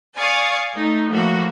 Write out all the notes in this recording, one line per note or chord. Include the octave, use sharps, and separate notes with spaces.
D5 F5 G#5 C#6 D#6
A3 D#4
A2 F3 A#3 F#4